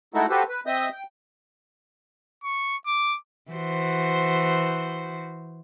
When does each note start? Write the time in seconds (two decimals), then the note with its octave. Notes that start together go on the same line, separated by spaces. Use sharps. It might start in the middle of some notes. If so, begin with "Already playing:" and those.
0.14 G#3 A3 D#4 E4 F#4 A4
0.30 F#4 G4 A4 B4 C5
0.49 B4
0.67 C4 D#5 E5 D#6 G6
0.93 G5
2.44 C#6
2.87 D6
3.51 E3 F#4 C5